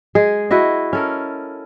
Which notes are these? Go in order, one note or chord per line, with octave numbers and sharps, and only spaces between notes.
G#3 G#4
E4 F#4 D#5
C#4 A4 A#4